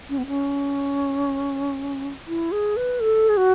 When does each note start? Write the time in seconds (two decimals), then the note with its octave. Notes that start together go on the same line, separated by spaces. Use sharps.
0.09 C#4
0.18 B3
0.27 C#4
2.27 E4
2.52 G#4
2.77 B4
3.00 A4
3.29 G#4
3.37 F#4